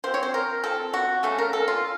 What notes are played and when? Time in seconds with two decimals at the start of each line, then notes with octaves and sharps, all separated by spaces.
0.04 F3 C4 C5
0.14 C#5
0.23 C5
0.34 A#4
0.64 F3 C4 A4
0.93 F#4
1.23 C#3 A3 C#4 A4
1.38 A#4
1.53 A4
1.68 F4